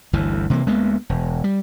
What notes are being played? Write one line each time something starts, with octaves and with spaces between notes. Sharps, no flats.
G1 D2 E3
C3 E3 A3 A#3
D2 G#3 A#3 B3
E1
G3